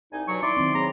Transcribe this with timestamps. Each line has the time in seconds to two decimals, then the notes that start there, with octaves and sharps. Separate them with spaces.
0.12 C2 D#4 G#5
0.28 G2 B2 F#3 C#6
0.43 D#4 E4 D5 C6
0.57 D#3 F#3 C4
0.75 C4 G#4 C#5 A#5